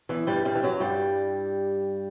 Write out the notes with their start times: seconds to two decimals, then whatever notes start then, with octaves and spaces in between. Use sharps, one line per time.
0.09 E2 E3
0.27 G2 G3
0.45 G2 G3
0.55 E3
0.63 F#2 F#3
0.80 G2 G3